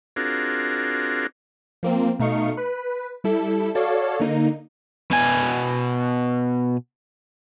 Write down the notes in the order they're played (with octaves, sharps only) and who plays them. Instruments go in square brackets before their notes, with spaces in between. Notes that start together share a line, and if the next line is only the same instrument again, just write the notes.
[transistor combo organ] C4 D4 F4 F#4 G#4 A#4
[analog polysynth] F3 A#3 C4
B2 A3 D#4 F5 C#6 C#7
B4
G3 E4 A4
F#4 A4 C#5 D5 F5
D3 A#3 D#4
[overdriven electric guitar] B2 G#5